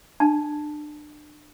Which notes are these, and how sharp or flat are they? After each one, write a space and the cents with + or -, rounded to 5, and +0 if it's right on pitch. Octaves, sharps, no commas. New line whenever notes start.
D4 +30 A5 +0